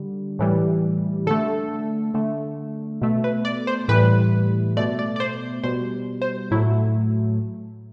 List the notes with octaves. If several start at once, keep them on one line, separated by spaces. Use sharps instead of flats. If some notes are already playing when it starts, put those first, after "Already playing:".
Already playing: D3 G3
A2 E3 G3
D3 A3 A4
D3 A3
B2 A3
B4
D5
C5
A2 E3 G3 B4
B2 A3 D5
D5
D5
C5
B2 G3 C5
C5
A2 F#3 A3 E4